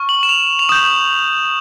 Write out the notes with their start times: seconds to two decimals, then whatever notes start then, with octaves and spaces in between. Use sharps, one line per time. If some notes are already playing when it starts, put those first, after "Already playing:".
Already playing: C#6 F6
0.09 F#7
0.23 E7
0.29 F7
0.59 F7
0.69 D#6 G6 E7